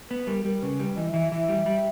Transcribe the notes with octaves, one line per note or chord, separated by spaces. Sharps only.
B3 B4
G3 A#4
G3 A#4
C#3 B4
G3
E3 D#5
E3 E5
E3 E5
G3
G3